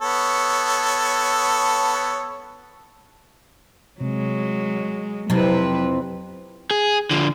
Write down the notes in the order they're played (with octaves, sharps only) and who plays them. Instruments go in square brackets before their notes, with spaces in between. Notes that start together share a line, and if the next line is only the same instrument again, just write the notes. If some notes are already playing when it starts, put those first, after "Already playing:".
[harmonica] B3 A4 C#5
[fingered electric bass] C3 [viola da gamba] F#3 G#3
[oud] F2 C3 [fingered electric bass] F#3 [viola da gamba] E4 B4
[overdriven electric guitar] G#4
D3 F3